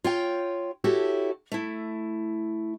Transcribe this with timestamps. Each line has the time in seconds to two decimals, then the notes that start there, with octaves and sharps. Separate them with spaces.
0.04 F4 C#5 G5
0.84 E4 F#4 G4 A4 C#5
1.52 A3 E4